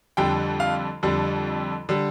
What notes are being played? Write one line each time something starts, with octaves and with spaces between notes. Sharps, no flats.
F2 D3 G3 G5
F5
F2 D3 G3
D3 G3